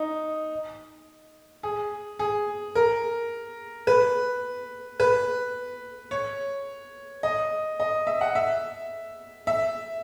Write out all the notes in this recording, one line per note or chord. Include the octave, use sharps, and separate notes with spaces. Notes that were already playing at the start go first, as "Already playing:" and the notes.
Already playing: D#4
G#4
G#4
A#4
B4
B4
C#5
D#5
D#5
E5
F#5
E5
E5